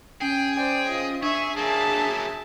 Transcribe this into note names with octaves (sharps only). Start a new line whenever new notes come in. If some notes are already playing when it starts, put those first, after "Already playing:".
C#4 G#4 G5
C5 D5 G5
F4 D#5
D4 G#4 E5 C#6
F#3 A#3 G#4 E5 A5